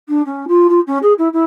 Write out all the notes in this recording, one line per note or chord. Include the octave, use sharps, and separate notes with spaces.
D4
C#4
F4
F4
C#4
G#4
E4
E4